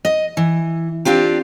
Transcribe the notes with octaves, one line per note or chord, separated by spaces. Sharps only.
D#5
E3
C4 D4 F4 G4